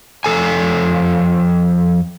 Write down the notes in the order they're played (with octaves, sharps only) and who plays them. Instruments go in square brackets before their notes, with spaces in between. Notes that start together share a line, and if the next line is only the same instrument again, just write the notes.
[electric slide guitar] F2 C#3 A4 G#5